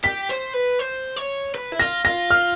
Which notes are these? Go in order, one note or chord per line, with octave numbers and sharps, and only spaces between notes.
G4 B6
C5
B4
C5
C#5
B4
E4
F4 A#6
F4 A#6
F6